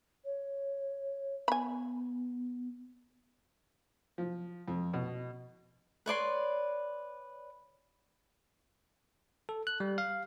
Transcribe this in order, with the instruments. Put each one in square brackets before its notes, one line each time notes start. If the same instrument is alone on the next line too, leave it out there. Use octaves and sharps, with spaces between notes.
[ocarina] C#5
[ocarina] B3 [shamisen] G#5 B5
[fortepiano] F3
F2
B2
[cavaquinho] B4 C#5 D5 C6
[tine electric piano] A4
F#6
G3
F5